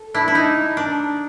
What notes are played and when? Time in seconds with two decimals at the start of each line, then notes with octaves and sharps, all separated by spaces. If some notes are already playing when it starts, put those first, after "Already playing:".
Already playing: A4
0.14 D4 E4
0.28 E4
0.35 D#4
0.77 D4